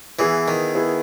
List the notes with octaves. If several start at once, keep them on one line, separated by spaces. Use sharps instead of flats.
E3 B3 E4 G#4
D#3
B3 E4 G#4